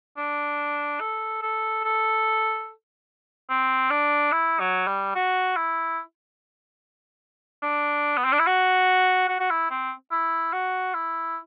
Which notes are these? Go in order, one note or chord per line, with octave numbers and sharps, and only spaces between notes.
D4
A4
A4
A4
C4
D4
E4
F#3
G3
F#4
E4
D4
B3
C4
D4
E4
F#4
F#4
F#4
E4
C4
E4
F#4
E4